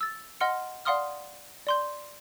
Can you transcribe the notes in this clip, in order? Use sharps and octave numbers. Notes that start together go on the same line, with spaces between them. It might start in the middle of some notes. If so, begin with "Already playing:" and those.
E6 A6
D#5 F#5 C6 F6 C#7
D5 F5 F#5 C6 D#6 F6
D5 C6 G6